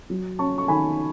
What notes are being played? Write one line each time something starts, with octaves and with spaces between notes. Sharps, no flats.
F#3
C#4 A5 C#6
C#6
D#3 G#5 B5